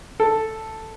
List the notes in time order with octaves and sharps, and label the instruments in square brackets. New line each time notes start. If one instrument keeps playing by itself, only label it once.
[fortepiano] A4